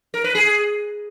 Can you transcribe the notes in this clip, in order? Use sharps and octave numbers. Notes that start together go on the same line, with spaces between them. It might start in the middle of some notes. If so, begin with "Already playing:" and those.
A#4
B4
G#4